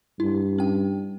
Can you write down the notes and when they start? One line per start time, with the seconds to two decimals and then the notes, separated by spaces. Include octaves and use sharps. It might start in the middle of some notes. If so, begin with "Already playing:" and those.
0.20 G2 E4
0.58 C#4 G5